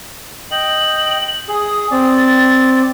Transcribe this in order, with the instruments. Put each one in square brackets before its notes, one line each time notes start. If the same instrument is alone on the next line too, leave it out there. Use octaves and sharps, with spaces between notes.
[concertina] D#5 G5 [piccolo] F#7
[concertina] G#4 [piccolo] D#6
[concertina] C4 D5
[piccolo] A6